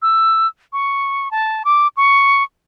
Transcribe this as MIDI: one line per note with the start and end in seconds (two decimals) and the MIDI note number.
0.02 0.47 88
0.73 1.31 85
1.31 1.63 81
1.65 1.88 86
1.97 2.43 85